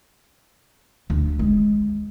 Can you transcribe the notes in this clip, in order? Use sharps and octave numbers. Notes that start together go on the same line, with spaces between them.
D2
G#3